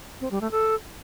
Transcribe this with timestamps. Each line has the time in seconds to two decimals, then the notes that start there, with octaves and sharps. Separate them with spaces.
0.21 C4
0.31 G3
0.41 A3
0.51 A4